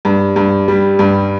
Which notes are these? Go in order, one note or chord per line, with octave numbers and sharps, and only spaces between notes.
G2
G2
G3
G2